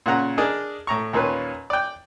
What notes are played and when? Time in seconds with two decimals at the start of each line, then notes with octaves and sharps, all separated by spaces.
0.06 A#2 C#3 F#5 A#5
0.38 D4 G#4 A#4 D#5
0.87 A2 A#5 C#6
1.13 D#2 A#2 A#3 C#4 B4
1.70 D5 G5